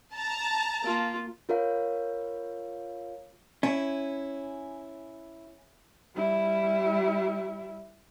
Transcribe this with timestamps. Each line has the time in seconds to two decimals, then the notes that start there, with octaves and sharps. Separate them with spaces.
0.14 A5 A#5
0.83 A#3 F4
1.49 F4 A#4 C#5 F5
3.63 C#4 E4
6.16 G3 E4